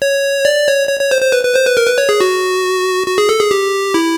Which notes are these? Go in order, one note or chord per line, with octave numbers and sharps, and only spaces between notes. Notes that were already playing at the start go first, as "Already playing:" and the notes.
C#5
D5
C#5
C#5
C#5
C5
C5
B4
B4
C5
B4
A#4
B4
C#5
G#4
F#4
F#4
G#4
A4
G#4
G4
E4